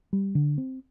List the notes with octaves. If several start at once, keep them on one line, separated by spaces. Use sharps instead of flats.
G3
D3
C4